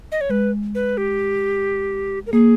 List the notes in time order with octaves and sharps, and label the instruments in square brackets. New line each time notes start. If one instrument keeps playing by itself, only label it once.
[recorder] D#5
C#5
[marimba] G#3 [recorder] B4
[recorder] B4
G4
A#4
[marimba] A#3 [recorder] G#4